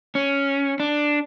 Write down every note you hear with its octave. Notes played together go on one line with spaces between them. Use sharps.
C#4
D4